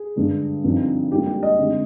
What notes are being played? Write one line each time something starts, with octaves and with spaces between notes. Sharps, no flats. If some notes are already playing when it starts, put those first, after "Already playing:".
Already playing: G#4
G2 D3 G#3
G2 D3 F3 C4 D#4
G#2 G3 A#3 D4 F4 G4
G4
D#5
D3 G#3 C4 D#4